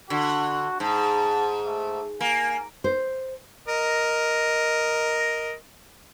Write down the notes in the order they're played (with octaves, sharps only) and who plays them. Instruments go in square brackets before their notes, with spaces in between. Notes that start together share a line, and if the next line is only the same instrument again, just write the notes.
[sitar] D3 [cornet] F#4
[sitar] G#2 [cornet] A5
[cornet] A3
[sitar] A#3 [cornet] G#5
[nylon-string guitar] C5
[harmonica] A#4 D#5